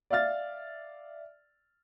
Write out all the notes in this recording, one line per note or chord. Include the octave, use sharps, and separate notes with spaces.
D5 E5 F5 F6 A6